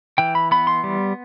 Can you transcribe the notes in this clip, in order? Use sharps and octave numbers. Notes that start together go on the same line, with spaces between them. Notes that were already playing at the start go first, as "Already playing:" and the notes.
E3 G5
B5
B3 B5
C6
G3